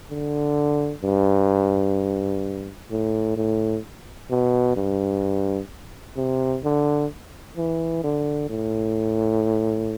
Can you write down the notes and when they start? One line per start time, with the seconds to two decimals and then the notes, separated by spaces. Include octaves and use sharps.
0.10 D3
1.03 G2
2.91 A2
3.37 A2
4.31 B2
4.76 G2
6.17 C3
6.64 D3
7.57 E3
8.04 D3
8.50 A2